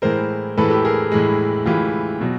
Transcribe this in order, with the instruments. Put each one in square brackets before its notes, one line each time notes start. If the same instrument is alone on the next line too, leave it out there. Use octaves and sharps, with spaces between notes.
[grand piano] A2 E3 G#3 A#4 C5
A2 E3 G#3 A4 B4
G4 A4
G#4 A#4
A2 E3 G#3
A2 E3 G#3 F4 G4
B2 F#3